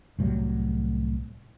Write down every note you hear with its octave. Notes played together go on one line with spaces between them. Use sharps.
C2 A2 F#3 G3